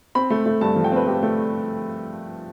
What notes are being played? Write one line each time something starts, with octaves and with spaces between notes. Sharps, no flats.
C4 B5
A3
A3
G2 A5
F3
G5
C4 B4
A3 G4
A3